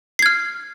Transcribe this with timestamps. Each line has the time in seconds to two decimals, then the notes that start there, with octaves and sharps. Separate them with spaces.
0.19 C7
0.22 G#6
0.26 F6